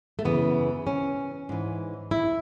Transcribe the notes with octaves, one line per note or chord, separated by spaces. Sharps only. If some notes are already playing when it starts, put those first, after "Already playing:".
A3
F#2 C#3 E3 B3
C#4
G#2 E3
E4